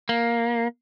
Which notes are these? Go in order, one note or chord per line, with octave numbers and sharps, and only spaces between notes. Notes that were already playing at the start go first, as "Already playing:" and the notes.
A#3